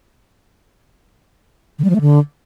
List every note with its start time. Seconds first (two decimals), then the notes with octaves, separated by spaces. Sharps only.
1.79 D3
1.84 G3
1.90 F3
1.95 A3
2.01 D3